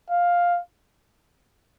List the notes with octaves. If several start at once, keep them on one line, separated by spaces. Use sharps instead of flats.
F5